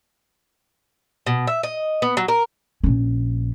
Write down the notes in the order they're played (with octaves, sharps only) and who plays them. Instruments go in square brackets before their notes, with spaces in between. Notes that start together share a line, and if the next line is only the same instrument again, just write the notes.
[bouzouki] B2
E5
D#5
B3
F#3
A#4
[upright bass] A#1 C#4